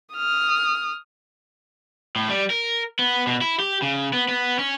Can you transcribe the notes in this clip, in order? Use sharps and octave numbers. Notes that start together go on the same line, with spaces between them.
D#6 F6
A2
G3
A#4
B3
B2
E4
G4
C#3
B3
B3
C#4